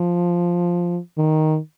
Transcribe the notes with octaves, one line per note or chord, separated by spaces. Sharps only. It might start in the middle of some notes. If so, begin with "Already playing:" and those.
Already playing: F3
D#3